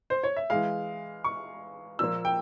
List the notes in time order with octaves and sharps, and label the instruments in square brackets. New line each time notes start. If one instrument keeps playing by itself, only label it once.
[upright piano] C5
C#5
E5
E3 G#3 F5
C#6
A#2 F3 A#3 E6
G5